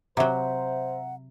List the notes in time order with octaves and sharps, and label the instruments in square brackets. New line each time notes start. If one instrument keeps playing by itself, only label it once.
[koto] C3 F#3 [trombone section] C5 [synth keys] E5 A#5 [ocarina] F#5